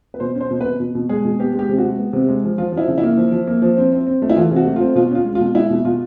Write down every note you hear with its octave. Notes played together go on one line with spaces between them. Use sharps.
B4
B2 C5
C#4 C5
B2
B2 B4
B2
B2
G#3 G#4
B2
B3 G4
G#3
G4
C3
F#4
G#3
B3
C3
G#3
F3
F3 F4
F3
E4
C#3
E4
A#3
F3
F3
A#3
F3
C4
C4
C4
A3
E4
E3 F4
C3
F#4
A3
C4 F4
B2 F4
C#4 F4
G#3
F4
B2
G#3 E4
B2
B2 F4